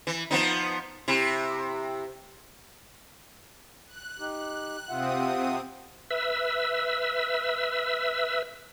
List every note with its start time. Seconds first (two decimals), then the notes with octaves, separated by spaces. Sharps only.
0.07 E3
0.31 F3 B3 D#4
1.08 C3 E4
3.87 F#6
4.19 D#4 G4
4.89 C3 C4 F4 E5 F#5 D#6
6.11 B4 E5 E6